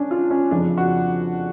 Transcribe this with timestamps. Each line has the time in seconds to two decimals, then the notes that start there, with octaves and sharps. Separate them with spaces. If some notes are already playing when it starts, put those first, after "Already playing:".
Already playing: G#3 C#4 D4
0.11 F4
0.31 C#4
0.51 F2 C#3 F3 G#3 D4
0.78 F#4